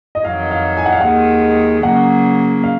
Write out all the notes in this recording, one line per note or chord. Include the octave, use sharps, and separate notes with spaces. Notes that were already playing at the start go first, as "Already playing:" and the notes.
D#5
F2 D#3 F#3 F5
F5
G#5
F#5
F5
D#2 D#3 G#3 F#5
C#3 F#3 A#3 F#5
F5